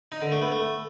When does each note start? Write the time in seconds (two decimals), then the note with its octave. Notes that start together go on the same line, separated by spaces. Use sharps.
0.12 D#4
0.22 D3
0.32 A3
0.42 B3
0.52 A3